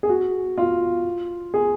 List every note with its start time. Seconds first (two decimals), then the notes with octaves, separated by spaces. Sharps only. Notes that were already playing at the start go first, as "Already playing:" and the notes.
0.03 G#4
0.09 F#4
0.58 F4
1.54 G#4